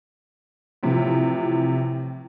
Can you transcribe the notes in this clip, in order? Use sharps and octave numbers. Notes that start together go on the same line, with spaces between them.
A2 C3 E3 F3